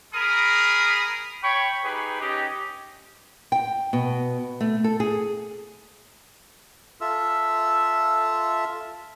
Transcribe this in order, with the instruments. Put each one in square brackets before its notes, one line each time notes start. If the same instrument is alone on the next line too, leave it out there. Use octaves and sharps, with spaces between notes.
[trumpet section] G#4 A#4 B5 D#6
C#5 G5 B5 C#6
D#4 G4 G#4 B4
C#4 D#4 G4
[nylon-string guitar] G5
B2
A3
A4
G#4
[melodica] F4 A4 E5 E6